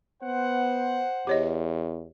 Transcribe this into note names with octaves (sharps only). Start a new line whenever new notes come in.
B3 C5 F#5
E2 G4 C#5 D#5